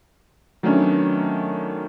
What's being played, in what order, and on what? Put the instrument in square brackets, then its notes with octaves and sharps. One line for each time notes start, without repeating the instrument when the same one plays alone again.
[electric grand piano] D#3 F#3 A3 B3 C#4 D4